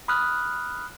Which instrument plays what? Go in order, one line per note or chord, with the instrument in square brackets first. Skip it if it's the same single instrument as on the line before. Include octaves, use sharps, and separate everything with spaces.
[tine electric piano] B5 D#6 F6 F#6